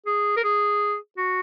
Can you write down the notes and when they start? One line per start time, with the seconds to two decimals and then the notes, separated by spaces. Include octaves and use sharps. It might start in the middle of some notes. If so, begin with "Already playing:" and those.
0.06 G#4
0.37 A#4
0.44 G#4
1.18 F#4